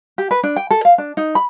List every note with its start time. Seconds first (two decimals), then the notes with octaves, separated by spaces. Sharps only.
0.18 G4
0.31 B4
0.44 D4
0.56 G5
0.71 A4
0.85 F5
0.98 D4
1.17 D#4
1.35 B5